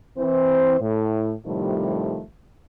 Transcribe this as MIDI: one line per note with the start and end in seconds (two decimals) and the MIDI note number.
0.17 0.78 52
0.17 0.78 60
0.17 0.78 72
0.80 1.31 45
1.45 2.21 45
1.45 2.21 48
1.45 2.21 51
1.45 2.21 53
1.45 2.21 55
1.45 2.21 57